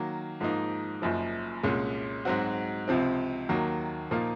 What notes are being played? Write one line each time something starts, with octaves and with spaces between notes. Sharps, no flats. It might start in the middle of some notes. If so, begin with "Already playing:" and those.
Already playing: D#3 F#3 A#3
G#2 F3 A#3 D#4
F#1 F#2 F3
C2 A#2 G#3 C#4
G#2 F#3 C4 F#4
C#2 C3 F3 C4
D#2 D#3 F#3 A#3
A#2 F3 A#3 D#4